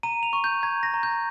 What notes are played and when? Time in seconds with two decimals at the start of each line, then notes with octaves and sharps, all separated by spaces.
0.03 A#5 D#7
0.23 F7
0.33 C#6
0.44 G6
0.63 A#5 G#6
0.83 A#6
0.94 A#5
1.03 G6